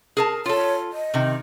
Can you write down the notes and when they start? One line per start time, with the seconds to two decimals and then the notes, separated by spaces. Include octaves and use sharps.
0.17 G#4 A#4 A5
0.46 F4 A4 C#5
0.92 D#5
1.14 C3 D#3